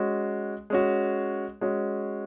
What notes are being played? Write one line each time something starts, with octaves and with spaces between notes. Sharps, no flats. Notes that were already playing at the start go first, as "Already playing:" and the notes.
Already playing: G#3 C#4 F#4
G#3 C#4 F#4
G#3 C#4 F#4